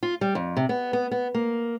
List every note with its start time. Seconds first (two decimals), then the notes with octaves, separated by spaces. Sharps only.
0.03 F4
0.21 G3
0.35 F2
0.57 C3
0.69 B3
0.93 B3
1.11 B3
1.34 A#3